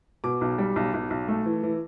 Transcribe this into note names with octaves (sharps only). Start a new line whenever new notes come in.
B2 D6
B1
G3
B1
B1
B1
A3
E3
E3